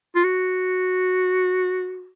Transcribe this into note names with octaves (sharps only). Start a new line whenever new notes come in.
F4
F#4